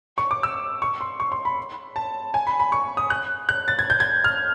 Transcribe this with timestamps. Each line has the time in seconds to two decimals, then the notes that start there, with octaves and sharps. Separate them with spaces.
0.18 C#6
0.31 D6
0.43 E6
0.82 C#6
1.01 C6
1.20 C#6
1.32 C6
1.45 B5
1.96 A5
2.34 G#5
2.47 B5
2.60 B5
2.72 C#6
2.97 D#6
3.10 F#6
3.49 F#6
3.68 A6
3.79 G#6
3.90 G6
4.00 G#6
4.24 F6